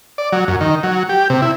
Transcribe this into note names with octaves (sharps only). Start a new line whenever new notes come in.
D5
F#3
F#2
D#3
F#3
G4
C3
E4